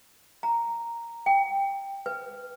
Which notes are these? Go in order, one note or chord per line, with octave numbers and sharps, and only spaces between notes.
A#5
G5
B4